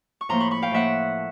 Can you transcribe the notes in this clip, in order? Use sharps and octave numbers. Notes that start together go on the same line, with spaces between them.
C#6
A2 F3 A#3 A#5 C6
B5 C#6
B5 C#6
F5 G5
A2 F3 A#3 E5 F#5